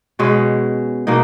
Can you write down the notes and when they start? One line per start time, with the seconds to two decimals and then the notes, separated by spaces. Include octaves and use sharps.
0.19 B2 G#3 C#4
1.07 B2 A#3 D#4